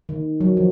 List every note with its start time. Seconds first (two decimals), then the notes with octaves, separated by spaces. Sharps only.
0.09 D#3
0.40 F#3
0.57 F3